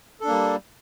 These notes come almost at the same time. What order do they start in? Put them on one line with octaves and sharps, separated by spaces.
A4 D4 A#3 G3